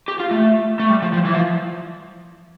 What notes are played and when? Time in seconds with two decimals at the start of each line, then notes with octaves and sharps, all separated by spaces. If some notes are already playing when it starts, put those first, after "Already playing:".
0.08 G4
0.20 F4
0.31 A3
0.80 A3
0.90 G3
1.02 F3
1.13 F3
1.25 E3
1.34 F3